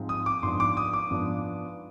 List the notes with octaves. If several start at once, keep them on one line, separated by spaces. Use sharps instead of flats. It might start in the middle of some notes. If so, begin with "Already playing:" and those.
Already playing: G#2 F3 G#3 C4
D#6
D6
G#2 F3 B3 D4 C6
D6
D#6
D6
G#2 F3 B3 D4